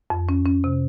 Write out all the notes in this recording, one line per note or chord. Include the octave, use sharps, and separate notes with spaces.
F2
C#4
C#4
C3